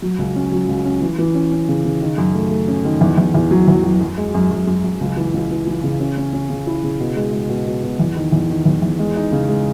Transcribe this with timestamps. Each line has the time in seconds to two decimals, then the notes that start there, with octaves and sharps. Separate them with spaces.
0.02 F#3
0.18 C#2
0.35 C#4
0.52 F#3
0.68 C#2
0.85 C#4
1.01 E3
1.18 E3
1.34 C#4
1.51 C#4
1.68 C#3
1.85 C#3
2.01 D#3
2.18 F#2
2.35 A3
2.51 A3
2.68 C#4
2.85 D#3
3.01 E2
3.18 E2
3.34 E2
3.51 F#3
3.68 E2
3.84 F#3
4.00 F#2
4.17 G#3
4.34 F#2
4.51 F#2
4.67 F#2
4.84 F#2
5.01 C#2
5.17 E3
5.34 C#2
5.50 E3
5.67 E3
5.83 C#3
6.00 C#4
6.17 C#4
6.33 C#4
6.50 C#3
6.67 E4
6.83 C#3
7.00 B2
7.17 G#3
7.33 G#3
7.49 B2
7.67 B2
7.83 B2
8.00 E2
8.16 D#3
8.32 E2
8.50 D#3
8.66 E2
8.82 E2
8.99 G#3
9.16 D#4
9.32 C#3
9.49 G#3